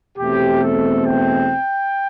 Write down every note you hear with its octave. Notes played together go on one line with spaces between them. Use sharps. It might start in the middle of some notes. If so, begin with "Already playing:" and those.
E2 B2 A3 C4 G4
A4
G5